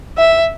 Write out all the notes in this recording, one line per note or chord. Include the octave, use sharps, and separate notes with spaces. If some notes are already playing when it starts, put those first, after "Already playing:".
E5